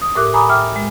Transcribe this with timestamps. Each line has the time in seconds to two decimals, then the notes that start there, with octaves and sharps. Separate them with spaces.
0.02 D#6
0.16 A2 G4 A#4 E5 D6 F#6
0.34 G#5 A#5 B5 D6 D#6
0.49 E5 G5 D6 F6
0.76 G#3